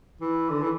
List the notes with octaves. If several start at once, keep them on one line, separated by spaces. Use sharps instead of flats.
E3
D3
E3